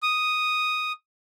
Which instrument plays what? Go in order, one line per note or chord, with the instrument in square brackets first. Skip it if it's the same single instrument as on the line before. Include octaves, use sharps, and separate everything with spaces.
[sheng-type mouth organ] D#6